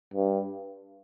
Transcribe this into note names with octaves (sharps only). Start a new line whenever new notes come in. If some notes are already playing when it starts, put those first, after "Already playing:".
G2